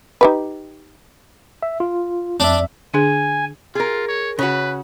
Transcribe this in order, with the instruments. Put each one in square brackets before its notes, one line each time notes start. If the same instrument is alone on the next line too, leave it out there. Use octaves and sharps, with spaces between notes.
[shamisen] D#4 G4 B4
[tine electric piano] E5
F4
[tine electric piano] F2 E5 [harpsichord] D4
[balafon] D3 D4 G#4 [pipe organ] G#5
[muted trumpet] F4 [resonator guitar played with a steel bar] G#4 A#4
[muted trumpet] C#5
[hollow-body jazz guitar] C#3 C#4 F#4 [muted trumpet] B4